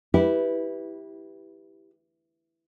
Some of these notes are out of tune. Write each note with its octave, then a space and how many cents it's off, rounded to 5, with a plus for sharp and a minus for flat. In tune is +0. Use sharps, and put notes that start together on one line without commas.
E4 -15 G4 +0 B4 +0